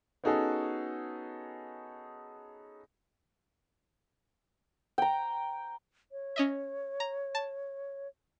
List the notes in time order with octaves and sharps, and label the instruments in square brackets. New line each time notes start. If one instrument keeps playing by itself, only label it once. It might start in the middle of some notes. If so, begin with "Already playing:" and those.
[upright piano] B3 C#4 D#4 F#4 G#4 A4
[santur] G5 A#5
[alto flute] C#5
[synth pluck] C#4 D#5 E5
A#5
A5